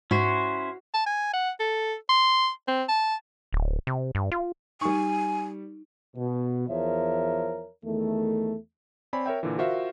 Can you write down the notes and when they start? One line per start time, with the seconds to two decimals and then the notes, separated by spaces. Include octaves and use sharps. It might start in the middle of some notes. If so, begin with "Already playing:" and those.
0.11 G#2 C#4 E4 F#4 C5
0.94 A5
1.06 G#5
1.33 F#5
1.60 A4
2.09 C6
2.68 C4
2.89 A5
3.53 D1
3.87 C3
4.15 G2
4.32 F4
4.81 G3 D#4 G#5 C#6
6.16 B2
6.70 E2 F3 A#4 C#5 E5
7.85 E2 D#3 A3
9.13 C4 C#5 D5 G#5 B5
9.26 A#4 C#5 E5 G5
9.43 A#2 D3 E3
9.58 F4 F#4 A#4 C5 E5 F5